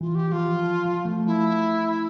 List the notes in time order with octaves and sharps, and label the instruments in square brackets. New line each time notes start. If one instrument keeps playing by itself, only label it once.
[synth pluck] E3 [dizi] F4
[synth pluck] E3 [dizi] G4
[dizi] G4
[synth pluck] F3 [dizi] F4
[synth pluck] F3
F3
F3
F3 A3
[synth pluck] F3 A3 [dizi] E4